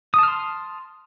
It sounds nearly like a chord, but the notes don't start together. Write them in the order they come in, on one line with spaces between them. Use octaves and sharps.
D#6 A5 F6 C6